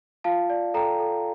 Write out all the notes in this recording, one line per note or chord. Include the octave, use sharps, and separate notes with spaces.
F4 F5 A5
D5
A4 G5 A#5
A4